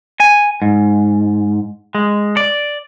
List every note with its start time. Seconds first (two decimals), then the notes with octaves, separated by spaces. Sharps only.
0.20 G#5
0.62 G#2
1.95 G#3
2.37 D5